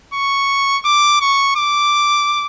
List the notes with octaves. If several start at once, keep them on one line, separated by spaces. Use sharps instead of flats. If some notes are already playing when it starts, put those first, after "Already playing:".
C#6
D6
C#6
D6